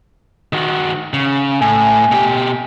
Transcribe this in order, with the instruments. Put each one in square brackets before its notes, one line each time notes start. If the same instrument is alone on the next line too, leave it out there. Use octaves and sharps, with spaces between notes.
[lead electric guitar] D#3 F#4
C#3
[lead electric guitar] A2 [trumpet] G#5
[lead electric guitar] B2 G4